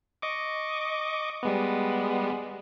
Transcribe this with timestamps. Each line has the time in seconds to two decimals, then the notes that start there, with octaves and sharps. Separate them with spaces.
0.22 D#5 C#6 D6
1.43 G3 G#3 B3